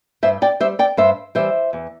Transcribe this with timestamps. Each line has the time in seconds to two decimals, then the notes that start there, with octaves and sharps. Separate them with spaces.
0.23 G2 C5 E5
0.42 D5 G5
0.60 G3 C5 E5
0.79 D5 G5
0.97 G2 C5 E5
1.35 E3 G3 C5 E5
1.73 E2